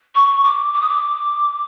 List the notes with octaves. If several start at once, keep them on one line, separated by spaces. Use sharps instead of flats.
C#6
D6
D6
D#6
D6